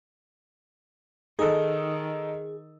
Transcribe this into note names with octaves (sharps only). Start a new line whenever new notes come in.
D#3 D#4 G#4 A4